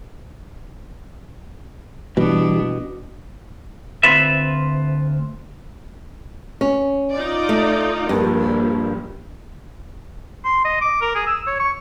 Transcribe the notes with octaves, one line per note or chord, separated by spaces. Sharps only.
B2 E3 G3 B3 D4
D2 C4 F4 B4 E5
C#4
D#4 F4 D5
A3
A#1 G2 F3
C6
D#5
D6
A#4
G#4
E6
C#5
C#6